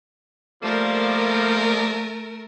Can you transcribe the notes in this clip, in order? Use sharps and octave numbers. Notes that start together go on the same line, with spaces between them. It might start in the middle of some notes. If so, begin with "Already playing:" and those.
F3 G3 A3 A#3 A#4